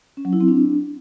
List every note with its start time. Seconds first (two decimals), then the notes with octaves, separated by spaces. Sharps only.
0.17 C#4
0.25 F#3
0.33 E4
0.40 C4
0.48 D4